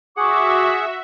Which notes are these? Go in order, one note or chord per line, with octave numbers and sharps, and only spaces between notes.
F#4 G#4 E5 F#5 C#6 D6